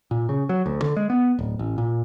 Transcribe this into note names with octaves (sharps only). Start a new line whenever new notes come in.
A#2
C#3
F#3
D2
D3
G#3
B3
D1
A1
A#2